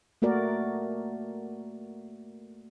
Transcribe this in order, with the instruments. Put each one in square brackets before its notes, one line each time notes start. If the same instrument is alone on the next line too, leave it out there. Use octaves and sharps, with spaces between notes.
[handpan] A3 A#3 F#4 A#4 D5